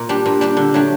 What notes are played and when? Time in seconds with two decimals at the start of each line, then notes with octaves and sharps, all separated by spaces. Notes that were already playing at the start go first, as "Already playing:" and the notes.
Already playing: A#2
0.09 G3 D4 G4
0.26 A#2
0.41 G3 D4 G4
0.57 D3
0.74 F#3 A3 D4 G4